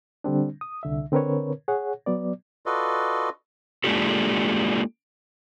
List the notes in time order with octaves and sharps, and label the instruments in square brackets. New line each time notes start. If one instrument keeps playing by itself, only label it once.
[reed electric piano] D3 G3 C4 D4
D#6
C2 D3 E5
D3 C4 A#4 B4 C#5
G#4 C#5 F#5
F#3 B3 D5
[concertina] F4 F#4 A4 B4 D5 D#5
[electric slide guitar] G#3 A#3 D4 F4 G4 A4